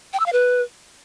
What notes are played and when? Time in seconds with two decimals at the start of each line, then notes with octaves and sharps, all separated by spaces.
0.13 G5
0.20 E6
0.26 F5
0.33 B4